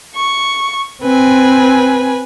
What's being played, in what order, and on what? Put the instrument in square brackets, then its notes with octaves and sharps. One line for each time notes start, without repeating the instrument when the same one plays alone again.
[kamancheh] C#6
[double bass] C4 [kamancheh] B4 G#5